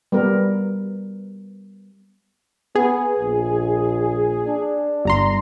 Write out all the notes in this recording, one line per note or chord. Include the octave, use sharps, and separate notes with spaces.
G3 B3 A#4
B3 G#4
A#1
D4
G1 A#5 C6